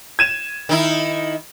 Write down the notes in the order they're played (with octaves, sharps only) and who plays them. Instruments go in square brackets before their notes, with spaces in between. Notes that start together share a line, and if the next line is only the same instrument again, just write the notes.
[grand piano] G#6 D#7 E7
[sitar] D#3 D#4 E4